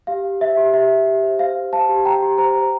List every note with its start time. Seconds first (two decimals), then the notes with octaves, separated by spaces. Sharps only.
0.07 G4 F5
0.24 G4
0.40 C5 E5
0.57 G4
0.74 G4 E5
0.90 G4
1.06 G4
1.23 C5
1.39 C5 F5
1.56 G4
1.73 C5 F5 A5
1.89 G4
2.05 C5 G5 A#5
2.22 G4
2.38 C5 G5 A#5
2.55 C5